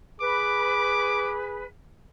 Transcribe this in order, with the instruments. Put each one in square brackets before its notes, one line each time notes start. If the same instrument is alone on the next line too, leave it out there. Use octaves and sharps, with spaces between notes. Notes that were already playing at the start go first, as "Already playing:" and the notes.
[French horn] G#4 [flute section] B4 [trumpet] D6